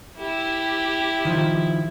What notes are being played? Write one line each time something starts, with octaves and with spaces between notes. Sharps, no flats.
E4 G4
D#3 F3